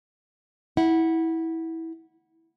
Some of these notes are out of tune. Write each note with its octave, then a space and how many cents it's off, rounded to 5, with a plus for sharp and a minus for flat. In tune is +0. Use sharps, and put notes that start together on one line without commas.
E4 -15 F#5 +0